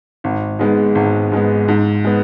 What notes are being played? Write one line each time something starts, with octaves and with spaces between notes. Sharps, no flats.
G#1
G#2 G#3 B3
G#1
G#2 G#3 B3
G#2
G#3 B3